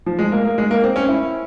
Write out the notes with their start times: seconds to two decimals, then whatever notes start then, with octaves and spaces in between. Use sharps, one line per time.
0.06 F3
0.19 G#3
0.32 A#3
0.45 A#3
0.58 G#3
0.71 A#3
0.84 C4
0.96 C#4
1.09 E4